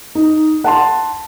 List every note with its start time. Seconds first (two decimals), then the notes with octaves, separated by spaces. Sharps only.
0.15 D#4
0.64 F#5 A5 C6